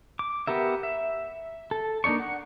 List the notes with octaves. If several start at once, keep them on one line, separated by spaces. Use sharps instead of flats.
D6
B3 G4 A#4 E5
E5
A4
A#3 D4 D#4 D5 C#6
F#5